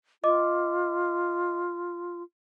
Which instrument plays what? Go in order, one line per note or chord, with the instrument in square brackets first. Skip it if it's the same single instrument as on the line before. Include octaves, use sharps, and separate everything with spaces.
[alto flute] F4 [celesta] D#5 D6